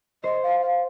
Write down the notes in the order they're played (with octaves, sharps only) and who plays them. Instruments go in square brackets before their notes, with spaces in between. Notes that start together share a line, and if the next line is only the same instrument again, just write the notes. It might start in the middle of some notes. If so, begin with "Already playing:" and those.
[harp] C5 [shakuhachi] D#5
[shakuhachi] F5
F5